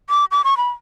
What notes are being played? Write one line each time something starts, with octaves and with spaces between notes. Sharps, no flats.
D6
D6
C#6
B5